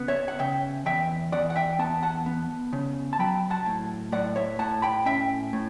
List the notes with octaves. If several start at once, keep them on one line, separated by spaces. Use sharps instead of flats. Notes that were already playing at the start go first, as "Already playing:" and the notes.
Already playing: C#3 B3
C#5 E5
F#5
C#3 E5 G5
E2 E5 G5
E2 D5 F#5
F#5
E5 G5
B3 F#5 A5
F#5 A5
B3
C#3
A5
F#3 G5 B5
F#5 A5
A2
A2 D5 F#5
C#5 E5
A2 F#5 A5
G5 B5
C#4 E5 G5
A2